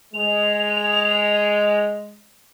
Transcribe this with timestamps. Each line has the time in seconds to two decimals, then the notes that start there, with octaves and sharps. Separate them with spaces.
0.14 G#3 F7